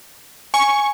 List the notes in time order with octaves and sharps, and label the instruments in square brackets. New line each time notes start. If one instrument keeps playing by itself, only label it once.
[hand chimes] G#5 [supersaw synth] C#6